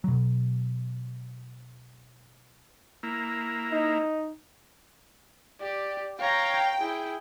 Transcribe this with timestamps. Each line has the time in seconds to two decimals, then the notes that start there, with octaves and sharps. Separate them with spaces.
0.04 B2 F#3
3.03 A#3 E4
3.72 D#4
5.61 G4 D5
6.20 C#5 F5 G5 A#5
6.80 E4 G#4